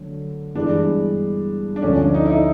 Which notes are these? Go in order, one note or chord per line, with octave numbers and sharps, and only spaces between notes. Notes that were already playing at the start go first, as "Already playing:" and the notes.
Already playing: D3 F#3 A3
G2 E3 G#3 B3 D4
D4
D2 D3 F3 C#4
D4
D#4
E4
D#4